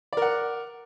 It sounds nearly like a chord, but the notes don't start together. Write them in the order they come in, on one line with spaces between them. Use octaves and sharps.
D5 A#4 F#5